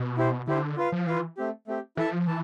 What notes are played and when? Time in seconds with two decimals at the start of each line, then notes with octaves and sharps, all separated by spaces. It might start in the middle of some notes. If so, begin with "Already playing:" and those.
Already playing: B2
0.18 E4 G4 C5
0.48 D3 E4 G4 C5
0.77 F4 B4 F5
0.92 F3
1.07 E3 F4 B4 F5
1.37 A3 C4 G4
1.67 A3 C4 G4
1.97 E3 E4 A4 E5 A5
2.12 F3
2.27 E3 A5